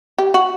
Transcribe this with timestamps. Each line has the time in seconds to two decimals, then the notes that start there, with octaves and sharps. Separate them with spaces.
0.18 G4
0.34 F#4